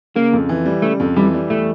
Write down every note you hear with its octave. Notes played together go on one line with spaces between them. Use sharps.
C#3 A#3
F2
E3
G3
C#3 A3
F2
E3 G3
G3
E2 A3